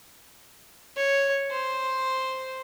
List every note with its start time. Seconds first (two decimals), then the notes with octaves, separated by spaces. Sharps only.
0.96 C#5
1.51 C5